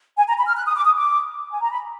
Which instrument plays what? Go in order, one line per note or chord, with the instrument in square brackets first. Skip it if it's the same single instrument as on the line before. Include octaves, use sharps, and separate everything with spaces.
[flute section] G#5
A#5
B5
F6
F#6
D#6
D6
D#6
D6
G#5
A#5
B5